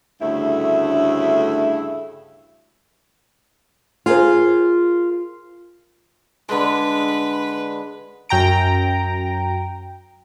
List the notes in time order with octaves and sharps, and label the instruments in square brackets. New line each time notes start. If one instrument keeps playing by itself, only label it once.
[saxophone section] D2 G2 C#3 A3 E4
[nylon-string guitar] F4 G#4 A#4 C5
[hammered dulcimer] D3 G#3 [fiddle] B4
[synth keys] F#2 G5 A#5 D7